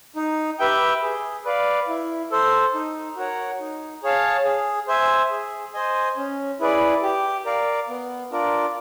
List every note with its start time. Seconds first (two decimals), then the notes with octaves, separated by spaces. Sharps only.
0.16 D#4
0.59 G4 B4 E5 G5
1.02 G#4
1.45 B4 D5 F5
1.88 E4
2.31 A4 C5
2.74 D#4
3.16 F#4 A#4 C#5 F#5
3.60 D#4
4.03 G#4 C#5 F5 A5
4.45 G#4
4.88 C5 E5 G#5
5.31 G#4
5.74 C5 D#5 G#5
6.17 C#4
6.60 E4 G#4 B4 D5
7.03 G4
7.45 A#4 D5 F5
7.89 B3
8.31 D4 F4 A#4 D5